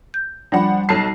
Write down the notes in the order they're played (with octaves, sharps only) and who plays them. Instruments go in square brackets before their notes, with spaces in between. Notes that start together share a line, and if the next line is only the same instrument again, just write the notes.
[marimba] G6
[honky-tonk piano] F3 D4 F#5 [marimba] G3 B5
[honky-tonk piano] B1 A5 C7